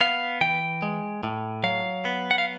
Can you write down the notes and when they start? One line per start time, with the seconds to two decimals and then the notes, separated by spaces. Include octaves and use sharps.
0.01 B3 F5
0.41 E3 G5
0.82 G#3
1.23 A2
1.64 F#3 F5
2.05 B3
2.31 F#5
2.38 F5